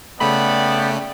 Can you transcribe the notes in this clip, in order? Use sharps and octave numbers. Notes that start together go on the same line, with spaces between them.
C#3 A3 B3 D5 G5 B5